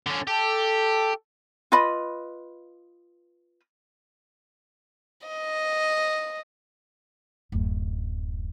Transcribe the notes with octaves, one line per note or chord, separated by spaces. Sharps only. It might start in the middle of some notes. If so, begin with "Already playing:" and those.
D3 C#4
G4 A4
F4 B4 D#5 B5
D#5
D1 F#2